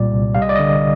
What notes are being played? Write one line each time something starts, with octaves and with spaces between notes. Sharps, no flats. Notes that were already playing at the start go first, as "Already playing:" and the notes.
Already playing: C2 A#2 G3 D5
C2
G3 F5
D#5
D5
D3 D#5